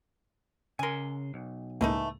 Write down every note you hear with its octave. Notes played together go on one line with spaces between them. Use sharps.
C#3 A#4 G#5 C6
B1
C#2 A2 E3 A3 A#3 D#4